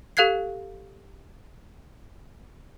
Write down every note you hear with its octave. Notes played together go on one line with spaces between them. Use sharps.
G4 A4 F5 F#6 G#6 C7